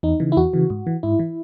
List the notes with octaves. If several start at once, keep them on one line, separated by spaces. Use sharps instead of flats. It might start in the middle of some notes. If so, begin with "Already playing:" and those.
E2 D#4
C#3 E3
E4
E2 F#4
C#3 E3
G#2
E3
G#2 E4
E3